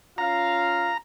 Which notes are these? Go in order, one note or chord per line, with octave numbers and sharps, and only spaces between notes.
C#4 F4 F5 A#5